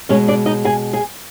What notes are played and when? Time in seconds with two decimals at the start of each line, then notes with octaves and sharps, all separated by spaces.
0.09 B2 G#3 C#4 C#5
0.28 D4 D5
0.46 D#4 D#5
0.65 G#4 G#5
0.93 G#4 G#5